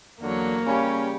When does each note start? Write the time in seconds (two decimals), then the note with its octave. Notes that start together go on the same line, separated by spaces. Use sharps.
0.22 E2 D3 F#3 A#3 C#5
0.66 C#3 G3 C#4 G4 G#4 C#5